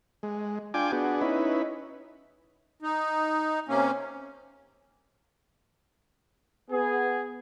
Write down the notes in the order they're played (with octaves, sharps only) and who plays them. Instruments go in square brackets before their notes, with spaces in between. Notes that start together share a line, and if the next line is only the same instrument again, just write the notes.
[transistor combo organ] G#3
D4 F4 G5 G#5 D6
B3 D4 F#4 G#4
C#4 D#4 E4 B4
[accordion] D#4
C3 A#3 C#4
[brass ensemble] B3 G#4